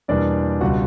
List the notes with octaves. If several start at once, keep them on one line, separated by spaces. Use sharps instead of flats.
E2 B2 G3 A#3 D4 D5
C#2 B2 G3 F#4 F#5